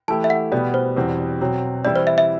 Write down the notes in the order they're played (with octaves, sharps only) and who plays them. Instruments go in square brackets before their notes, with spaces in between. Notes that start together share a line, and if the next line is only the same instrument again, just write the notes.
[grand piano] E3 A3 E4 G4 [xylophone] A5
[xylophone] E5
F#5
[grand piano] B2 G3 B3 [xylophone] D5
[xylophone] C5
[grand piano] E2 B2 G3 C4
B2 F#3 C4
[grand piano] E3 G3 C4 E4 [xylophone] D5
[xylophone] C5
E5
E5